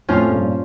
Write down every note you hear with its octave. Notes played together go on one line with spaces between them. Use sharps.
F2 A2 F3 C#4 F4
G2 A#2